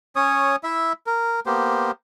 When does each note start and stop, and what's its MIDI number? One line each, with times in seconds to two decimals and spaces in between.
0.16 0.56 61
0.16 0.56 73
0.16 0.56 87
0.64 0.93 64
0.64 0.93 76
1.07 1.40 70
1.46 1.91 58
1.46 1.91 59
1.46 1.91 67
1.46 1.91 72